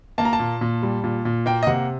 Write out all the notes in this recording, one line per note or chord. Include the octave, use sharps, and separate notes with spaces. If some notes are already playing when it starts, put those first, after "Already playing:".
A#3 A5
A#5
A5
A#2
A#2
G3
A#2
A#2
A#3 G5
D#5
C3 F#5